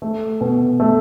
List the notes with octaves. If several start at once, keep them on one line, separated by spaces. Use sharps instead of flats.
A3
B2
A3